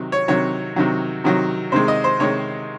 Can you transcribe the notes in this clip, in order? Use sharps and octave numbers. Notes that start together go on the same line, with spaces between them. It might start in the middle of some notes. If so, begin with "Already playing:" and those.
Already playing: C3 D#3 F#3
C#5
C3 D#3 F#3 C#5
C3 D#3 F#3
C3 D#3 F#3
C3 D#3 G#3 C5
D#5
C5
C3 D#3 G#3 C#5